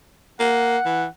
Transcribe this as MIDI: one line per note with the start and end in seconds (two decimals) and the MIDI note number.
0.40 0.78 58
0.40 1.06 78
0.86 1.06 52